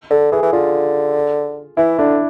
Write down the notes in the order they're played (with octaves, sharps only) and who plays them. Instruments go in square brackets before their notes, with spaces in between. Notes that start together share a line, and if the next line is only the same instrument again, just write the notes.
[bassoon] D3 [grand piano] A4
[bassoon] E3 [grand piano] G#4
[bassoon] E3
[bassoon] D3 [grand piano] F4
[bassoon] E3 [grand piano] E4
[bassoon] D3 [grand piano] D4